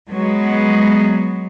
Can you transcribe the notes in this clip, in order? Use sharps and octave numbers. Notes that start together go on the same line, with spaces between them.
F#3 G#3 B3